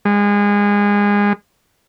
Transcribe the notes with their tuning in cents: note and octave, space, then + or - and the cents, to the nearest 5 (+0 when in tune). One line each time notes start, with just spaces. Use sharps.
G#3 -25